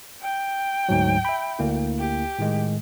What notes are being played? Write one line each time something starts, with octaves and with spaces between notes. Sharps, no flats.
G5
D2 G#2 F#3
E5 B5
D2 A#3 E4
G4
A2 D#3 G#3